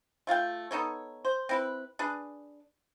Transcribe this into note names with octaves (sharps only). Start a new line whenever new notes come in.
A3 F4 F5 G5
B3 D#4 A4 C#5
C5
C4 E4 B4
D4 G#4 B4